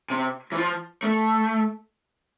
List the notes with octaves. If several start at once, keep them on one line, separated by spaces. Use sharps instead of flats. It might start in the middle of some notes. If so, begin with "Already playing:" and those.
C3
E3
F3
A3